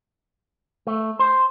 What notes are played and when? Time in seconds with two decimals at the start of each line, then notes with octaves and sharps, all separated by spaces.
0.87 A3
1.19 C5